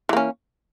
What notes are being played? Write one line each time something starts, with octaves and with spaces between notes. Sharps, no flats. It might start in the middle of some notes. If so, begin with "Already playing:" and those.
E3 A#3 C#4